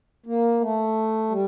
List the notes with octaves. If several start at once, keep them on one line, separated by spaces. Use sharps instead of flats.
A#3
A3
G3